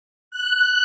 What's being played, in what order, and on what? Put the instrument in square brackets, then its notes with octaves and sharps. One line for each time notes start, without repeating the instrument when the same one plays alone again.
[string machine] F#6